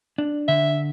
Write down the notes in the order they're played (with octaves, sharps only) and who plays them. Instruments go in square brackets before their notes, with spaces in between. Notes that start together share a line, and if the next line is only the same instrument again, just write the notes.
[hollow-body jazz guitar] D4
[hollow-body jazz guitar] D3 [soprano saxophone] E5